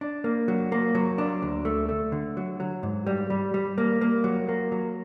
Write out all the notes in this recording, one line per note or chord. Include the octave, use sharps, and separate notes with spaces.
D4
A#3
F#3
A#3
F#3
D4
D2
A3
A3
D3
F#3
F#3
G#2
G3
G3
G3
A#3
A#3
F#3
A#3
F#3